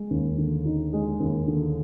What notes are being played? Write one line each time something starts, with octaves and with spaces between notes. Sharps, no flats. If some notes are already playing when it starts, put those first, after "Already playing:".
Already playing: G#3
D#2
D3
D#4
G#3
D#2
D3